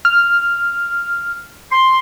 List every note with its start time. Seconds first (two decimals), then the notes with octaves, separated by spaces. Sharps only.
0.05 F6
1.71 C6